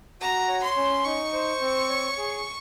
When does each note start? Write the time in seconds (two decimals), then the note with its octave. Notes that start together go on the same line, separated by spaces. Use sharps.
0.21 F#4 A#5
0.49 C#5
0.64 C6
0.77 C#4
1.05 D#4 C#6
1.33 C5
1.61 C4
1.89 C#5
2.17 G#4